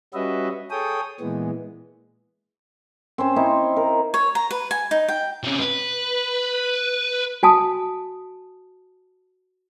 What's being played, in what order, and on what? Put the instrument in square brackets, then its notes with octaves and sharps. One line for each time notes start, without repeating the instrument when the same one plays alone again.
[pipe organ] G3 C#4 F#4 B4 D#5 E5
G#4 A4 C#5 G5 D#6
A#2 E3 G#3 B3
[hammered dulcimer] C4 C#4 C5
C4 D#4 E4
A#4
[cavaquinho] C#5
A#5
B4
G#5
D#4
G5
[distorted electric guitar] C3 C#4
B4
[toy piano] F#4 G#5 A5 D#6